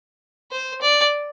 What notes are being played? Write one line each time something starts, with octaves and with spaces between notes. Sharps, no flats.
C5
D5